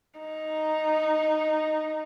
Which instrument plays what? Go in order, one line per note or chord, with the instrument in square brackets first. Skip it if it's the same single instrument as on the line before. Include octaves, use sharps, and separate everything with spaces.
[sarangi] D#4